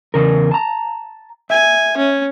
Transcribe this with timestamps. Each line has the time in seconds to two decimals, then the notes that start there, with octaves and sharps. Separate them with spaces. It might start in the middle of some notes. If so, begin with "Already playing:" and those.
0.14 E2 C#3 A#4
0.52 A5 A#5
1.50 E5 G#5
1.97 C#4